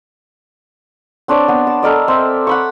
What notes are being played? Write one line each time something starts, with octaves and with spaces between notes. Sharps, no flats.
C4 D4 C#5 D5
B3
A5
A4 A#4 D5 D#5
C4 E5
F#5 B5 C#6